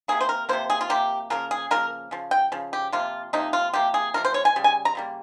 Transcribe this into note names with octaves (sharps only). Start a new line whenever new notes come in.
C3 F3 A#3 G#4
C5
A#4
C3 F3 A#3 C5
G#4
F4
C3 F3 A#3 G4
C#3 F3 A#3 A#4
G#4
C#3 F3 A#3 A#4
C#3 F3
G5
C#3 F3
G4
C3 F3 A#3 F4
C3 F3 A#3 D#4
F4
C3 F3 A#3 G4
G#4
C3 F3 A#3 A#4
C5
C#5
G#5
C#3 G3
G#5
A#5
C#3 G3 A#3